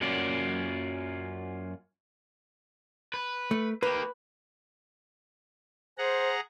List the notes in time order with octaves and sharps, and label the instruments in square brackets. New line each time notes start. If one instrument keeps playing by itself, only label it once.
[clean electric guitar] F#2 F#3 A#3 C#4 F4 D5
[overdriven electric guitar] B4
[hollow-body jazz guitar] A3
[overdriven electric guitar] A#3 G4 [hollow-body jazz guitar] B4
[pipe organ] G#4 F#5 A#5 [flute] C5